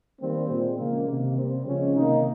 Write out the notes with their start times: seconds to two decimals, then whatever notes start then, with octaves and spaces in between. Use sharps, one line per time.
0.21 D#3 G3 A#3 C4
0.49 A#2 G#3 C4
0.78 C#3 F3 G#3 A#3
1.08 C3 D#3 A#3
1.37 C3 G3 A#3 C4
1.66 C#3 F3 G#3 C#4
1.96 C3 D#3 A#3 D#4